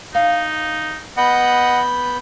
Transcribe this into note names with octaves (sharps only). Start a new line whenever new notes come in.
D#4 F5
B3 D#5 F#5 B5 G6